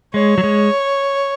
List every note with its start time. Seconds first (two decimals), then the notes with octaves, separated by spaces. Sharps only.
0.14 G#3 C#5
0.38 F#3
0.44 G#3